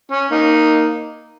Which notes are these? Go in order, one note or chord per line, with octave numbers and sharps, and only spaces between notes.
C#4
A#3 D#4